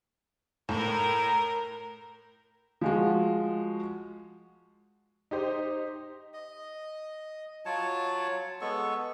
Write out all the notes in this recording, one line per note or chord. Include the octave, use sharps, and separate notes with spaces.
A2 A#4
F3 G#3 F#4
D#4 G4 C5
D#5
F#3 F4 C#5 A5
G#3 B3 A4 C#6